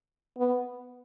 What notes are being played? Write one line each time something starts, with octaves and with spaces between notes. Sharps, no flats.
B3